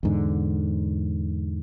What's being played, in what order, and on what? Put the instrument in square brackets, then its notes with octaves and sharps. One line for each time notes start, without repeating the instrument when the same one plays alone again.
[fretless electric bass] E2 G#2 D3